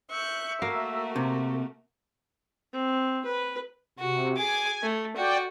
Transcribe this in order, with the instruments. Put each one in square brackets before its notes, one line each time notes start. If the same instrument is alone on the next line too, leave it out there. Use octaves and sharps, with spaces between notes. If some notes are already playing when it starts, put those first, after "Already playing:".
[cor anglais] E5 [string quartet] C#6 F#6 G6
[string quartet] A3 F#4 A#4 [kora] A#3
[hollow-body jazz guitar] C3
[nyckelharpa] C4
B4
[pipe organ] C3 [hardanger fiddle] F#4
[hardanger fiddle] G#4 D6 [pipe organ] G#5
[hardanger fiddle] A3
[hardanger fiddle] F#4 [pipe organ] D5 G5